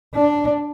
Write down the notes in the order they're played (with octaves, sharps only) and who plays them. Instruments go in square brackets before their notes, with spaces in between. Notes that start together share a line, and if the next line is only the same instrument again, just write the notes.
[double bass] D4